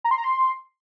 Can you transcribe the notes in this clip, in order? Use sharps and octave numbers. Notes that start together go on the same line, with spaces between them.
A#5
C6
A#5
C6